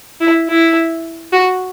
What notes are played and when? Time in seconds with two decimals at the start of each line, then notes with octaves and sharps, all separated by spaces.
0.20 E4
0.49 E4
1.33 F#4